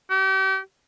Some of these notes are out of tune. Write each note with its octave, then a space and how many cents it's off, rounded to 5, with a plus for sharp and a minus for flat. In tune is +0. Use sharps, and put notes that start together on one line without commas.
G4 -35